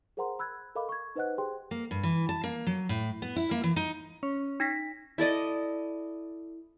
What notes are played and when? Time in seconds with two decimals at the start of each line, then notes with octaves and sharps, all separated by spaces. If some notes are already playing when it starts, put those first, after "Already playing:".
0.17 G#4 A#4 C5 F#5 A#5 C6
0.39 B5 E6 F#6 G#6
0.75 A4 A#4 D#5 F5 B5 D6
0.89 C#6 G#6
1.16 D#4 B4 C5 D#5 F#5 F#6
1.38 G4 G#4 C5 G5 C6
1.71 A#3
1.91 G2
2.03 E3
2.29 A5
2.44 A#3
2.67 F#3
2.89 A2
3.22 B3
3.36 E4
3.51 A#3
3.63 E3
3.76 D#4
4.23 C#4
4.60 D#4 A#6 B6
5.18 E4 A4 D5 D#5